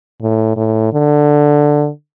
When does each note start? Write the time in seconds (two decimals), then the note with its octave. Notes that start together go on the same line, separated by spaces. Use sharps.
0.22 A2
0.57 A2
0.93 D3